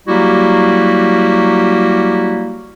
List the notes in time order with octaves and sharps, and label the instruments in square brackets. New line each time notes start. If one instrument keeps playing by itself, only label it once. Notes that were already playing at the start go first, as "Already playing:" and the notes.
[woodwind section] F#3 G3 A#3 E4 F#4 G4